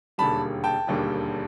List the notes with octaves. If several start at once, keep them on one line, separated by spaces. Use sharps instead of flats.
E1 D#2 D3 G3 A5 B5
G5 A5
E1 D#2 D3 G3